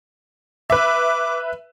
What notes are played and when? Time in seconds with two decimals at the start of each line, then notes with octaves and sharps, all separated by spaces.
0.70 B4 E5 D6